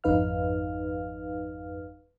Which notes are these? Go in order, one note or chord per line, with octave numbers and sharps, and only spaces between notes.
G#1 F2 D#4 B4 F5 F6